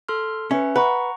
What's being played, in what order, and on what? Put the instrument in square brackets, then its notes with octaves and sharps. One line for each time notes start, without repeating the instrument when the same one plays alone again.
[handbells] A4 C6 F6
[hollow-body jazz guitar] C#4 [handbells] B4 E5
[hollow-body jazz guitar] B4 [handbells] F#5 A#5 C#6